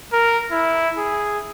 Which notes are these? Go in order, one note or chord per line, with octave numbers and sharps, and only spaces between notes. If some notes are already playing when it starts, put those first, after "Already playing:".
A#4
E4
G#4